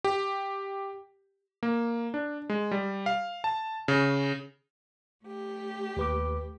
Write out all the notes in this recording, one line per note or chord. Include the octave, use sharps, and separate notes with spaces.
G4
A#3
D4
G#3
G3
F5
A5
C#3
A3 G4
D#2 B4 D6